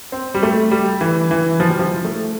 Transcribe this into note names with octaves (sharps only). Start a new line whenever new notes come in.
C4
G3
A3
G3
E3
E3
F3
G3
F3
A3